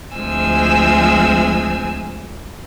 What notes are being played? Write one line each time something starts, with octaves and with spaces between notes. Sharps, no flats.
D2 F3 G#3 C4 G#5 E6